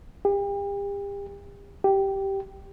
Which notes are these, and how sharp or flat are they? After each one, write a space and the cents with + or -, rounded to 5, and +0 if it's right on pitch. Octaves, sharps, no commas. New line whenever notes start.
G4 +35
G4 -10